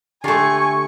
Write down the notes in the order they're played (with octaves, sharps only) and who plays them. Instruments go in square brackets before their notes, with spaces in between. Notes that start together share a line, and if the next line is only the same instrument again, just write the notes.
[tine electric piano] D3 G4 [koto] A3 F4 [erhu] G#5 [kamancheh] C#6